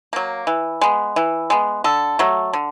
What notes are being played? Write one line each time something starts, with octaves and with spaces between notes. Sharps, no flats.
F#3 A#3
E3
G#3 B3
E3
G#3 B3
D3 A4
F#3 A3
D3